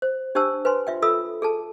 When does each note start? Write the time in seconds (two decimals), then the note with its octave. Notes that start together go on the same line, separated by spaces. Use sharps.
0.02 C5
0.35 D4 G4 C5 G5 A5 E6
0.65 B4 C5 G#5 C6
0.87 F4 E5 G5
1.02 F4 A4 E5 B5 D#6 E6
1.42 G#4 A4 A5